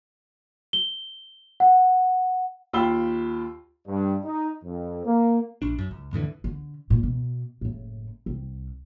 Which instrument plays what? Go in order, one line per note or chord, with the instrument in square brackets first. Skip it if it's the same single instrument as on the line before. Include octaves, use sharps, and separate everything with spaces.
[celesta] G7
F#5
[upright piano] D#2 F4 G5 B5 E6 G7
[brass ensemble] G2
D#4
F2
A#3
[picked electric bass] A#1 D4
F#2
C#2
F2 A2 D3 E3
[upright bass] D3
A#2
B2
F#1 A2
C2